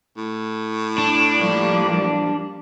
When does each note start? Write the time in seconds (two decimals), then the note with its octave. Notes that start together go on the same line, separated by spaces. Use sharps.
0.17 A2
0.98 D4
1.37 F3 G3 A#3